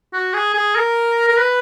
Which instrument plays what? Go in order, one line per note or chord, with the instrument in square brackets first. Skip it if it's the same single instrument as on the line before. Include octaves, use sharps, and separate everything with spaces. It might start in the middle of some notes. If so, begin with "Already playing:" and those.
[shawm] F#4
G#4
G#4
A#4
A#4
B4